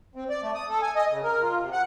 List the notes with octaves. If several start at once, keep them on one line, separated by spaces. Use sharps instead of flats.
C4
D5
A3
D#6
A4
G#5
D#5
C#3
A#4
F4
C3
F#5